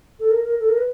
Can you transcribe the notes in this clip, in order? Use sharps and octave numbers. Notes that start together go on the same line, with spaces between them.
A4
A#4
A#4
A4
A#4
B4